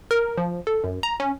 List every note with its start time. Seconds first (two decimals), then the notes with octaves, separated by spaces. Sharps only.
0.11 A#4
0.37 F3
0.67 A4
0.84 F#2
1.03 A#5
1.20 C#4